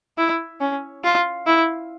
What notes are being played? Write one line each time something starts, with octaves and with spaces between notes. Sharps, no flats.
E4
C#4
F4
E4